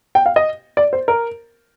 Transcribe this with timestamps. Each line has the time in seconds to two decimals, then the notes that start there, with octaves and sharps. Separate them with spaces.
0.15 G5
0.26 F5
0.36 D#5
0.77 D5
0.93 C5
1.08 A#4